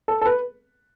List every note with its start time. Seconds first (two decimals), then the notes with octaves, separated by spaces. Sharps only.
0.08 A4
0.22 A4
0.26 B4